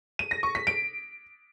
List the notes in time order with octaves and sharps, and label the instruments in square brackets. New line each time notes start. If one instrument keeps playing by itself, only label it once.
[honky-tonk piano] D#7
A#6
C#6
B6
D7